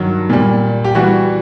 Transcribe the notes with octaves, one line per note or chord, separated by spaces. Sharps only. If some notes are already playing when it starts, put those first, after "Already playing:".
Already playing: G2 D#3 F#3
A#2 G3
G4
E3 G3 F#4